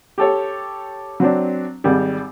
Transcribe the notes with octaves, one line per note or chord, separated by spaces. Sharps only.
G4 A4 C#5
F#3 C4 D4
G#1 G3